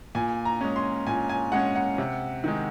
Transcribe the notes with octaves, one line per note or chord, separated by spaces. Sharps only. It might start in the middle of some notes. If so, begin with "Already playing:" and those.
A#2 G#5
A#5
G#3 C#4
C6
A#2 G#5
G#5
G#3 C#4 F#5
F#5
C3
D#3 G#3